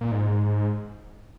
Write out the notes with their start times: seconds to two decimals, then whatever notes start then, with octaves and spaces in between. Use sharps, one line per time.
0.01 A#2
0.12 G#2